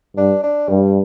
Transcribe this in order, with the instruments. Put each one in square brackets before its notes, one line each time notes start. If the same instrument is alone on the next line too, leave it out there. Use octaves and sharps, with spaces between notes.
[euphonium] G2 [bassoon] D4
[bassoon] D4
[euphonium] G2 [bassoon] G3